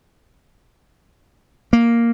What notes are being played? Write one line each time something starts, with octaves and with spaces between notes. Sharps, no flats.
A#3